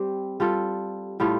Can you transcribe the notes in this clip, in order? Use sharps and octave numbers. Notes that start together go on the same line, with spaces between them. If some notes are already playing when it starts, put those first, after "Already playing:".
Already playing: G3 C4 G4
G3 F4 A4
A2 G3 F4 A4